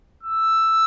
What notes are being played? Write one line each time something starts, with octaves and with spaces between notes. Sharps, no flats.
E6